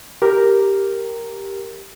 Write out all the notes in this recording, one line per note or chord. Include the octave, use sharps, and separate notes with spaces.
G4 A#4